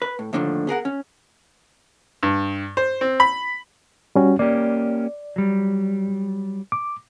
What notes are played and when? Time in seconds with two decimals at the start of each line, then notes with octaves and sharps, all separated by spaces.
0.02 B4
0.19 A2
0.33 D#2 A2 D3 D#3 F3
0.67 B3 G#4 A#4 F#5
0.85 C#4
2.23 G2
2.77 C5
3.01 C4
3.20 B5
4.16 G3 C#4 F#4
4.39 A#3 C#4 G4 D5
5.36 F#3 G3
6.72 D6